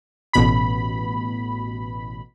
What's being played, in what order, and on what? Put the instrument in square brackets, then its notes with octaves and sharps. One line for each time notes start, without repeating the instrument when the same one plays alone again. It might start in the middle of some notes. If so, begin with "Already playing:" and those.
[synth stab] A1 B2 B5